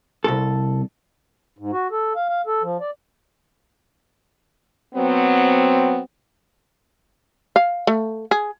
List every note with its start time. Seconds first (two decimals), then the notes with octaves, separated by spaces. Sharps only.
0.24 C2 A4
1.58 G#2
1.73 F#4
1.91 A4
2.16 F5
2.29 F5
2.47 A4
2.63 F3
2.80 D5
4.95 F#3 B3 C4
7.56 F5
7.87 A3
8.31 G#4